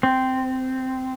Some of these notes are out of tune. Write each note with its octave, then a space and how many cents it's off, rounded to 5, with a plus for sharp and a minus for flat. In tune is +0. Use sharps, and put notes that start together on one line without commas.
C4 -10